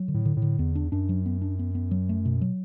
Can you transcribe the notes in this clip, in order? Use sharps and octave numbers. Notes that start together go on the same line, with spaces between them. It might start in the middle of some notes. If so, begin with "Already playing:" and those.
Already playing: F#3
D3
A2
D3
A2
D3
E2 B3
D4
F#2 D4
F#3
B3
D4
B3
B3
F#3
A3
B2
F#3